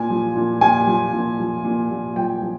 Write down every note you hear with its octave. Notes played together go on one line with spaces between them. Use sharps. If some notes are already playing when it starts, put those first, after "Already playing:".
Already playing: A#2 G#5
F3
A#2
A#2 G#5
F3
A#2
F3
A#2
A#2
F3 G5
F3